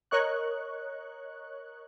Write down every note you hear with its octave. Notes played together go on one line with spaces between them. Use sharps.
A#4 C#5 D#5 C#6 F#6